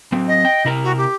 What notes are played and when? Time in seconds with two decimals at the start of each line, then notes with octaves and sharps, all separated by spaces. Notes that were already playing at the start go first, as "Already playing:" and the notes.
0.12 F#3 C4
0.28 D#5
0.45 G5
0.65 C3 E4 A#4
0.84 F#4
0.97 G4